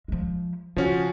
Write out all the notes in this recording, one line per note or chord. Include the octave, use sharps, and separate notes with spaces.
F3 G#3
C#3 F3 C#4 F#4